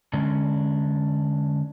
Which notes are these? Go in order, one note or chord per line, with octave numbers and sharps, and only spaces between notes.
D3 G#3 C#4 D4